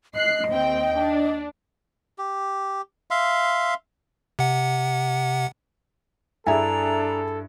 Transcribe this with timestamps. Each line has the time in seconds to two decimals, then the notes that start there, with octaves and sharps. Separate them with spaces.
0.14 D#5 F#6 C7
0.49 D#2 C4 G5
0.96 D4
2.18 G4
3.11 E5 F5 C6
4.39 C3 F#5
6.47 G2 D4 E4 G#4 A4 E5 G#5 A#5